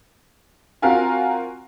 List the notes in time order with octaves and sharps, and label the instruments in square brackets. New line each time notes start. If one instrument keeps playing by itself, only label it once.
[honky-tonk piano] C4 F4 F#4 A#4 F5 G#5